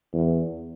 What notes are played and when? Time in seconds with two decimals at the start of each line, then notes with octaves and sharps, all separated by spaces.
0.13 E2